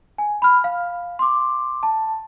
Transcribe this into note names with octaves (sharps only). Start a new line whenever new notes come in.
G#5
B5 F6
F5
C6 D6
A5